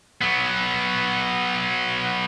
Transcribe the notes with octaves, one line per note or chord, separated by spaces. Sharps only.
F#3 B3